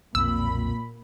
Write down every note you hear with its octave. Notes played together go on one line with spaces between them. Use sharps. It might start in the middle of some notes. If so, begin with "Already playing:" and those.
B1 F2 A#2 C4 B5 E6